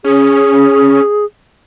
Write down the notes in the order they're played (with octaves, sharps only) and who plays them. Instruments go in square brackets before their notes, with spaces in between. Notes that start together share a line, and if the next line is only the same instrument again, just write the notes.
[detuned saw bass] C#4 [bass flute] G#4